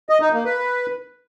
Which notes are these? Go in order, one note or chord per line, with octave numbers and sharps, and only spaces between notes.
D#5
D#4
A#3
B4